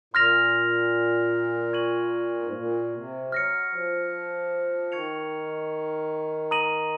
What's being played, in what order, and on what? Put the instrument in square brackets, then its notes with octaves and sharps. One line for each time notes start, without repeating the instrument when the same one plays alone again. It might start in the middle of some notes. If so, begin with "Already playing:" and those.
[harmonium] A#2 [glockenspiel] C6 F6 A#6 F7
[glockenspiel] C#6 G#6 D#7 F#7
[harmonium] G#2
A#2
C3
[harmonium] F#3 [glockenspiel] F6 A#6 C#7
[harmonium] F3
[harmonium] D#3 [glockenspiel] C#6 G#6 C#7 F7
[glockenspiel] A#5 D#6 A#6 D#7 F#7